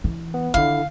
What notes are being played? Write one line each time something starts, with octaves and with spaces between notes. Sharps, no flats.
E3
B3
D3 D#3 E4 F4 F5